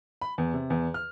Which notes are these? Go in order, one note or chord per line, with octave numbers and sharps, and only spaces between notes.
B5
E2
C3
E2
F6